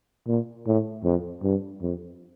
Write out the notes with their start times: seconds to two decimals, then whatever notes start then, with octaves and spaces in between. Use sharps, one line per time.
0.27 A#2
0.67 A2
1.04 F2
1.43 G2
1.82 F2